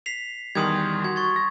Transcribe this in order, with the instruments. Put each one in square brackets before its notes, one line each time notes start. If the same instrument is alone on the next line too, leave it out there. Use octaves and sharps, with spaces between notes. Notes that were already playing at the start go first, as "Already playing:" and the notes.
[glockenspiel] B6 C7 F7
[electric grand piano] E2 D#3 G3 [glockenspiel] C6 D#6 G#6
[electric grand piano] F#4 [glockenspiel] G#6
[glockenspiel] C#6 G#6 A6
[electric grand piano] A#6